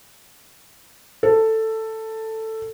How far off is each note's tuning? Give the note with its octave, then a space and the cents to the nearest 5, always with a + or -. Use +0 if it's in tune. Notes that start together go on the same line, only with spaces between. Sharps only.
A4 +10